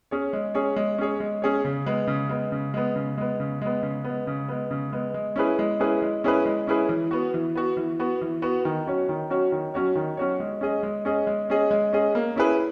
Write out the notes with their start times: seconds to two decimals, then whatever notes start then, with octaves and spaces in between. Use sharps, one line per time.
0.11 C#4 G#4 C#5
0.33 G#3
0.54 C#4 G#4 C#5
0.76 G#3
0.98 C#4 G#4 C#5
1.20 G#3
1.42 C#4 G#4 C#5
1.65 C#3
1.86 G#3 B3
2.07 C#3
2.29 G#3 B3
2.52 C#3
2.74 G#3 B3
2.96 C#3
3.18 G#3 B3
3.40 C#3
3.61 G#3 B3
3.83 C#3
4.04 B3
4.10 G#3
4.27 C#3
4.48 G#3 B3
4.71 C#3
4.92 G#3 B3
5.14 G#3
5.36 C#4 E4 G#4 B4
5.59 G#3
5.80 C#4 E4 G#4 B4
6.02 G#3
6.24 C#4 E4 G#4 B4
6.45 G#3
6.67 C#4 E4 G#4 B4
6.89 E3
7.11 B3 F#4
7.34 E3
7.55 B3 F#4
7.77 E3
7.99 B3 F#4
8.21 E3
8.42 B3 F#4
8.65 D#3
8.86 F#3 C#4 F#4 C#5
9.09 D#3
9.30 F#3 C#4 F#4 C#5
9.52 D#3
9.74 F#3 C#4 F#4 C#5
9.95 D#3
10.17 F#3 C#4 F#4 C#5
10.40 G#3
10.61 C#4 G#4 D#5
10.83 G#3
11.05 C#4 G#4 D#5
11.27 G#3
11.50 C#4 G#4 D#5
11.71 G#3
11.93 C#4 G#4 D#5
12.15 A#3
12.36 C#4 E4 G#4 B4